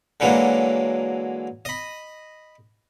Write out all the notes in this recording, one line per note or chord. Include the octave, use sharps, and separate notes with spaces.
D3 E3 F#3 G#3 A#3
D#5 B5